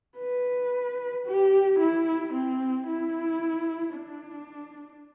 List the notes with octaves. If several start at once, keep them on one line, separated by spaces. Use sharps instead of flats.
B4
G4
E4
C4
E4
D4